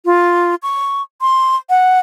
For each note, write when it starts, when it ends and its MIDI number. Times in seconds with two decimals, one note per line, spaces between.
0.06 0.55 65
0.63 1.02 85
1.21 1.56 84
1.70 2.00 78